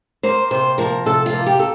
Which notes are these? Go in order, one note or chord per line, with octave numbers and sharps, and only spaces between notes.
A#3 C5
C3 C5
F3 A#4
C3 A4
F4
A#3
G4
A4